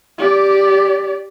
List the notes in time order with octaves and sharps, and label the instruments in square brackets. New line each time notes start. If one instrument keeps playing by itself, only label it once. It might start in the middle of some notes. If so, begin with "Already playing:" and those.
[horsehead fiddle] G4 D5